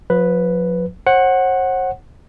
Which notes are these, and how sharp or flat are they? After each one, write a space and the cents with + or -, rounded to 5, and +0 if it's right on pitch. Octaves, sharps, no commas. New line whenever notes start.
F3 +45 B4 +0
C5 +45 F#5 +0